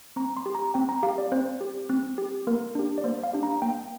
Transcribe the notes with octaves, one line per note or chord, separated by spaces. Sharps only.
C4 A#5
C6
G4
A#5
C4 G5
A#5
G4 F5
D5
C4 C5
G4
C4
G4
A#3 A#4
D4 G4
D5
A#3 C5
F5
D4 G4
A#5
A#3 G5